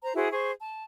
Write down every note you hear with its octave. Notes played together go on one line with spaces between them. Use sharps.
C5 A#5
E4 F#4 G#4 C5
G#4 C5 C#6
A5